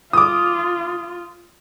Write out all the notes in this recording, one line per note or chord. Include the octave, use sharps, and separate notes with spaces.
F4 D6 D#6